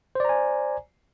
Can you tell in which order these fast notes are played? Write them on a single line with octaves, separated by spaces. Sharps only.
C5 D5 A#5 G#5